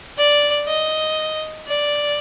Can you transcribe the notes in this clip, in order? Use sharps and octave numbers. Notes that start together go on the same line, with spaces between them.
D5
D#5
D5